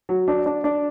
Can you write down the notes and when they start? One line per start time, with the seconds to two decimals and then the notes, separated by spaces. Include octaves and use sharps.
0.09 F#3
0.28 D4
0.46 D4
0.64 D4